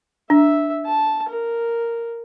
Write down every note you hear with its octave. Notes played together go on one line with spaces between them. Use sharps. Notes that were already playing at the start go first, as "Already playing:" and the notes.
D4 E5
A5
A#4